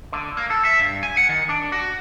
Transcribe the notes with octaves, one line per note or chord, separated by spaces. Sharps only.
D3
A#3
A4
E5
G2
G#5
F#5
D#3
D4
F#4